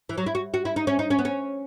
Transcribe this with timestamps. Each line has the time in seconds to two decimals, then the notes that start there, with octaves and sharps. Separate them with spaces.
0.09 E3
0.18 F#3
0.26 E4
0.35 F#4
0.54 F#4
0.65 E4
0.76 D#4
0.87 C#4
0.99 D#4
1.10 C#4
1.19 B3
1.25 C#4